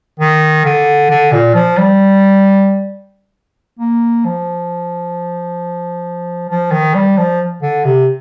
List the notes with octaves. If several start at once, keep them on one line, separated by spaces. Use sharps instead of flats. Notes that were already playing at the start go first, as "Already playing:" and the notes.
D#3
D3
D3
A#2
F3
G3
A#3
F3
F3
D#3
G3
F3
D3
C3